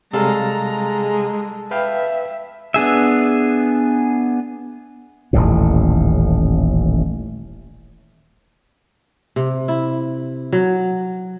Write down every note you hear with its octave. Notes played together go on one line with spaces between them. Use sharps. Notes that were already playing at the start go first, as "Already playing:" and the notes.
C3 G3 G#3 A4 F5 A#5
B4 E5 F5 G5
B3 D4 G#4 E5
D#1 A1 D#2 A2
C3
E4
F#3